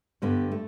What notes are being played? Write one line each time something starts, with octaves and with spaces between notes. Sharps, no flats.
G2 D3 G3 B3
A3